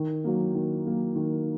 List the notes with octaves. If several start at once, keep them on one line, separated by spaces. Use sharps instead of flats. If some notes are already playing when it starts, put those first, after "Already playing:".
Already playing: D#3
F#3 A#3
D#3
F#3 A#3
D#3